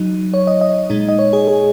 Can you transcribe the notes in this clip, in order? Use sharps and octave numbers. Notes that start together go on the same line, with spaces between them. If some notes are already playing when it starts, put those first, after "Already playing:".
Already playing: F#3 D#4
C#5
D#5
D#5
A#2 G#3 D#4
D#5
C#5
G#4
G#4